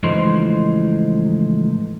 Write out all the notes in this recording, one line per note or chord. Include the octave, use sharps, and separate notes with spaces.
C#2 A2 E3 F3 D#4 C5